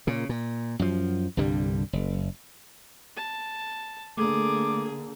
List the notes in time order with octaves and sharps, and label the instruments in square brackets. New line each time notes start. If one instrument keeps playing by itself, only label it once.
[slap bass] A#2 C#3
A#2
F#2 F3
C2 G2 D3 G3
F#1
[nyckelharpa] A5
[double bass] D3 A#3 [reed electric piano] A3 [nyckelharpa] G#4 [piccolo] D6